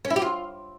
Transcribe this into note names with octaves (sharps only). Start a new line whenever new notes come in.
C#4
E4
G4
F4